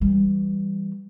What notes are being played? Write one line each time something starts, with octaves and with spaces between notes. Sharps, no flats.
E3 G3